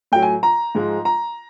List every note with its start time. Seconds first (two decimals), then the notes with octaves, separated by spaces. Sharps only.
0.12 A2 F#3 G5
0.22 G#5
0.43 A#5
0.75 G#2 F3 G#3
1.05 A#5